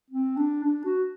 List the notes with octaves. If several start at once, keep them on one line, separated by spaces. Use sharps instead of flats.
C4
D4
D4
F#4